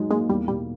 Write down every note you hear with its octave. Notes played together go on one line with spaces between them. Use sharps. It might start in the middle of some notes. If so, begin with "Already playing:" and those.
Already playing: F#3 G#3 D#4
G#3 A#3
E2 G3
B2 G3